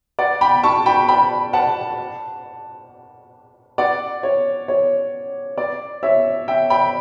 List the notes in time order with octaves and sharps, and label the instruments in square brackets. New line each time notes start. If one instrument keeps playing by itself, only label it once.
[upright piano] D5 F#5
G5 B5
A5 C#6
G5 B5
G5 B5
F#5 A5
D5 F#5
C#5
C#5
D5
C#5 E5
E5 G5
G5 B5